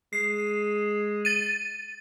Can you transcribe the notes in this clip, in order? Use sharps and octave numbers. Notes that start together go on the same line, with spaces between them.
G#3 C7
A6 D#7